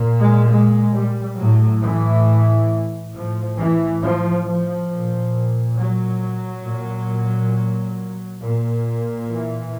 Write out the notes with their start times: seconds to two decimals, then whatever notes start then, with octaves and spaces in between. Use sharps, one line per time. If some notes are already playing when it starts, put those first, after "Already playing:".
Already playing: A#2
0.20 G#3
0.50 G#3
0.94 G3
1.38 A2 F#3
1.82 E3
3.13 A2 F3
3.58 E3
4.02 F3
4.46 F3
4.89 A#2
5.77 F#3
6.65 A#2
8.41 A#2
9.30 E3